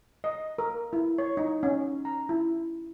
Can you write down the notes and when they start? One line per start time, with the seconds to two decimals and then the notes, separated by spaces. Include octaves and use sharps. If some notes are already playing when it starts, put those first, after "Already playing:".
0.24 D#5
0.58 A#4
0.93 E4
1.18 C#5
1.37 D#4
1.63 C#4
2.05 A#5
2.29 E4